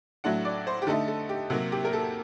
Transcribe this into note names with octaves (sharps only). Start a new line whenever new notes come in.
A2 F#3 A3 D4 F#5
D5
C5
G4
D3 A3 D#4 A4
A4
G4
C3 F#3 A#3 F#4
G4
A#4
A4